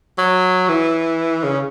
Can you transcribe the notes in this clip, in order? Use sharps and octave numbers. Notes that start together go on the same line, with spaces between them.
F#3
E3
C#3